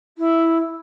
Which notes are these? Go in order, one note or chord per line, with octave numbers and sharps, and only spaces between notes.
E4